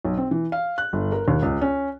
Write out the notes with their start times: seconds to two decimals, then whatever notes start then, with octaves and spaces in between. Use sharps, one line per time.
0.05 B1
0.18 C4
0.31 E3
0.52 F5
0.78 F#6
0.93 G1
1.12 A#4
1.28 D#2
1.42 C#2
1.61 C#4